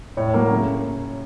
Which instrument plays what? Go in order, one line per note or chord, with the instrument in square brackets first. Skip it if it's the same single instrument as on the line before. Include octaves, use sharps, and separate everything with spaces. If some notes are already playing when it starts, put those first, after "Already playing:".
[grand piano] A2 C#5
F#3 A#3
C#3